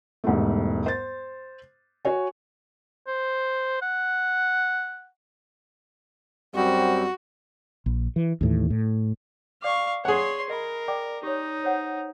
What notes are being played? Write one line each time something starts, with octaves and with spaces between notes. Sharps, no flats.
E1 G#2 G3 A3
C5 A6
F#4 C#5 G#5
C5
F#5
F#2 G3 C4 F#4
A#1
E3
D#2 A2 E3
A2
D5 F5 C#6 D6
G#4 C#5 F#5 C6
A#4 D#5 B5
D5 G5 D6
D#4 G4 C#5
C5 C#5 F#5